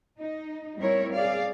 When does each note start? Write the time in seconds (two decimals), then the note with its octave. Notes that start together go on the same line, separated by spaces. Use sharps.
0.18 D#4
0.78 G3 C4 E4 A#4 C#5
1.13 G#4 D5 F5